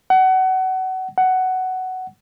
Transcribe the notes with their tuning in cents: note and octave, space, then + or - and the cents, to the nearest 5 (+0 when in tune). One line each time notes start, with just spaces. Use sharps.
F#5 +25
F#5 +10